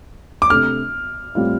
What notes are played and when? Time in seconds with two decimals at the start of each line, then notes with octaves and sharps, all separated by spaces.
0.42 D6
0.50 C3 A3 D4 F6
1.35 A2 G3 C4 F4